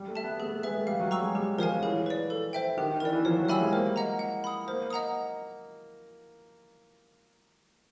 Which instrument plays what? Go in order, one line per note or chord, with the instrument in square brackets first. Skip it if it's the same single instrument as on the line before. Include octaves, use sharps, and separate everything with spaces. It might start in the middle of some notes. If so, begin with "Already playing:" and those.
Already playing: [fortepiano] G3
A3
[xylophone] E5 A5
[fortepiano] B3
[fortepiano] A3 [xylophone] G#4
[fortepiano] A3
[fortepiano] G#3 [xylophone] B4 E5
[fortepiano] A3
[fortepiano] G3 [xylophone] F5
[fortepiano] F#3
[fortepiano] G3 [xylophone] A#5 C#6 E6
[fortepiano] G#3
[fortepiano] G3 [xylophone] G4
[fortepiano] F3 [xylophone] A#4 C#5 F5 G#5
[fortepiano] E3 [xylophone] G#4
[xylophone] B4 D5
A4
C5 E5 G5
[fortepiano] D#3 [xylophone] G4
[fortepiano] E3 [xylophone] A#4
[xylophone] D5
[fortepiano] E3
[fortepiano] F3 [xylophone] C#5
[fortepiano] F#3
[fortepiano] G3 [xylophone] E5 G#5 B5 E6
[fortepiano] G#3
[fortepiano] A#3 [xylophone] C5
[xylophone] D#5 F#5 A#5
F#5
B5 D#6
[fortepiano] A#3 [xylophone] C5
[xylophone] D#5 F#5 A#5 D#6